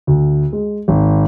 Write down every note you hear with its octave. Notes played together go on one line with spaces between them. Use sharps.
D2
G#3
G#1